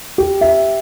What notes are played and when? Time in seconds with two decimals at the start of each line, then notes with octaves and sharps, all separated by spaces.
0.18 G4
0.41 E5